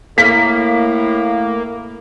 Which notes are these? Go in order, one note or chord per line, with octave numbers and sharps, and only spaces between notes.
A2 A#3 B6